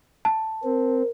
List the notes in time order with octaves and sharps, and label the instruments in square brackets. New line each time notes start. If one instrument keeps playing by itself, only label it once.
[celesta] A5
[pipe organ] C4 [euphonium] A#4